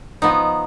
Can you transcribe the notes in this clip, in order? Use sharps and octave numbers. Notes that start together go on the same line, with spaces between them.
F3 B3 D#4